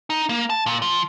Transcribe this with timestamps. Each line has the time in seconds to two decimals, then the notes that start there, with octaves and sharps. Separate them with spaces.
0.10 D#4
0.29 A#3
0.50 A5
0.66 A#2
0.82 F3